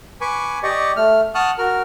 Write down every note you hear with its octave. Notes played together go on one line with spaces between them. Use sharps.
B4 G#5 C#6 D6
G4 D5 D#5 C#6
A3 F6
F#5 A5 C#6 D#6 F6 F#6
F#4 A#4 F6